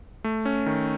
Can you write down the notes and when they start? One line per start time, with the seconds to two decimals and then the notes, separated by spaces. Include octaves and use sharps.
0.24 A3
0.45 C#4
0.66 D#3